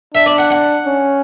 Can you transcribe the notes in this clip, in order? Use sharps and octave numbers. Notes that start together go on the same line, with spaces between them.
D4 E5
D5
F#5
F#5
C#4